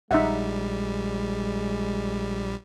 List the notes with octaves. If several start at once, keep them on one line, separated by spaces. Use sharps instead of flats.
A#1 G3 G#3 D#4 E5 F#5